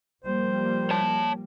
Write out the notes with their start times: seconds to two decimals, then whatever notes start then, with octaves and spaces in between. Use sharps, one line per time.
0.25 F3 G3 A#3 C5
0.91 C#5 A5